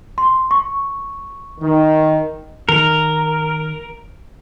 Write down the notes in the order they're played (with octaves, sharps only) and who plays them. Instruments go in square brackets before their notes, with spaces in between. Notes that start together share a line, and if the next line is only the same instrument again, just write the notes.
[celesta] C6
C#6
[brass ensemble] D#3
[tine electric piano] D#3 [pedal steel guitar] A#4